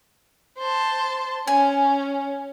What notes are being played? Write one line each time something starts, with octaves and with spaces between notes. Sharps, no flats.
C5 A5
C#4 G#5